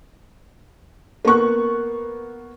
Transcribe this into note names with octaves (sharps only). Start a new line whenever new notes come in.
A#3 B3 C#6 F#6